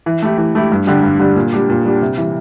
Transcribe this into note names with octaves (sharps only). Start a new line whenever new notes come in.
E3
A3 E4 G4
E3
A3 E4 G4
G2
D3 G3 D4 G4
G2
D3 G3 D4 G4
A#2
G3 D4 G4
A#2
G3 D4 G4
C3
E3 G3